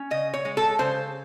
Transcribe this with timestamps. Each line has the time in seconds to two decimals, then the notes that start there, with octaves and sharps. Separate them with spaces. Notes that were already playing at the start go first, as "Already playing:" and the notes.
Already playing: C#4
0.11 C#3 D#5
0.34 C#5
0.45 G#3
0.57 A4
0.79 C#3 C5